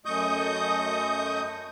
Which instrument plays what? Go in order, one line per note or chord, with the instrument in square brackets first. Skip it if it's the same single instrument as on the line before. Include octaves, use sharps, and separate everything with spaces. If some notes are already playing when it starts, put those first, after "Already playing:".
[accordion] F#2 A3 D#5 C#6 D#6 G6